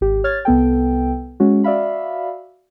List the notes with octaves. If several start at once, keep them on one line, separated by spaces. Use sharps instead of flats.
G#1 G4
C#5 F6 G#6 A6
C2 B3 A4 G5
G#3 C#4 F#4
F#4 D5 E5 F5 B5